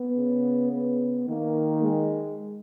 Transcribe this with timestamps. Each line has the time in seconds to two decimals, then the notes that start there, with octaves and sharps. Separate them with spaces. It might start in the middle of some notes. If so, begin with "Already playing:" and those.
Already playing: B3
0.17 C#3
0.72 B3
1.28 D#3 A#3
1.82 G#3